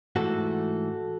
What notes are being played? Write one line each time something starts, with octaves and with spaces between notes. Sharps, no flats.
G#2 E3 A3 F#4 A4